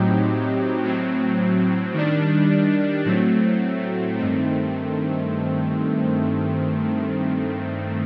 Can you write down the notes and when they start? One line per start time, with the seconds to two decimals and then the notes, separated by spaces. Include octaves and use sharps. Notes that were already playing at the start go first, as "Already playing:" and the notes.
Already playing: A2 F#3 C4 D#4 G4
0.83 A2 F#3 C4
1.94 D#3 G3 D4
3.05 A2 F#3 A3 C4
4.17 G2 D#3 A3 C4